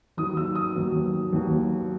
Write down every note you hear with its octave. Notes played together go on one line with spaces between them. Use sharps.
D#2 D#3 F#3 D#6
E6
D#6
D#2 D#3 F#3
D#2 D#3 F#3